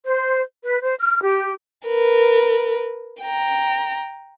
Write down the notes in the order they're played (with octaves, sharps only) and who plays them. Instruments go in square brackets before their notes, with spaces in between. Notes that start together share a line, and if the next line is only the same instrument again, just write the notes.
[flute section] C5
B4
C5
F6
G4
[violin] A#4 B4
G5 A#5